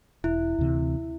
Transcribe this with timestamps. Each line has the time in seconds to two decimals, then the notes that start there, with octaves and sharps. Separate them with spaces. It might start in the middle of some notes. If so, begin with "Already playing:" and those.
0.24 E1 E4
0.58 D2 C3 E3